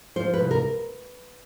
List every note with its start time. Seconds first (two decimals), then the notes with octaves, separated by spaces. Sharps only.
0.16 F3 C5
0.34 B4
0.39 C2
0.51 A#4